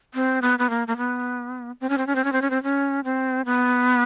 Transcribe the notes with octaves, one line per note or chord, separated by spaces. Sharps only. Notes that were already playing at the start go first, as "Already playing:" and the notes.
C4
B3
B3
A#3
A#3
B3
C4
C#4
C4
C#4
C4
C#4
C4
C#4
C4
C#4
C4
B3